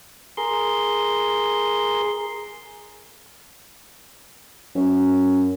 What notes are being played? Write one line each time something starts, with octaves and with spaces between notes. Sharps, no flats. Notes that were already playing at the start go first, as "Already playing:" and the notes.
G#4 A#4 C6
F#2